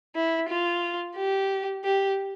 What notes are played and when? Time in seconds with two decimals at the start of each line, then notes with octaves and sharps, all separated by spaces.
0.16 E4
0.49 F4
1.17 G4
1.84 G4